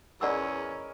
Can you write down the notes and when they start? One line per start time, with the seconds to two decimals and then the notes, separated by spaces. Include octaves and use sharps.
0.21 E2 C#4 G#4 A#4 D5 D#5 F#5 E6